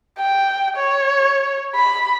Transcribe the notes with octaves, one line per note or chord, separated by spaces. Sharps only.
G5
C#5
B5